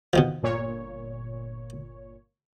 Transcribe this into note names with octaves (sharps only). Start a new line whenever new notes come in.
B2 D#3 F3
G1 A#2 C#5